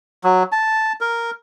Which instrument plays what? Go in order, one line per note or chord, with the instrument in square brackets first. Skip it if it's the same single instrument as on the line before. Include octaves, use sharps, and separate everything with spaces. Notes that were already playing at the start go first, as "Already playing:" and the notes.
[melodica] F#3
A5
A#4